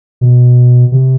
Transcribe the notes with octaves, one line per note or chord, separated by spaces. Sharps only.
B2
C3